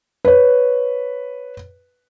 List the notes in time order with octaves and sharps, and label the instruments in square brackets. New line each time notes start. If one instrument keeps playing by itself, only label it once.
[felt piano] B4 C#5